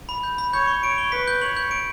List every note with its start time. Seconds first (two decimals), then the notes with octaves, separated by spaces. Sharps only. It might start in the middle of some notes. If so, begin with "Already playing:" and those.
0.09 B5
0.23 G6
0.38 B5
0.53 C#5 G6
0.67 C#6
0.83 C#5 D7
0.98 G7
1.12 B4 B6
1.28 G6
1.41 C#5 F#7
1.57 G6
1.71 D7